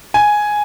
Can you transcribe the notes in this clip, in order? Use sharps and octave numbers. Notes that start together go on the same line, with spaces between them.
G#5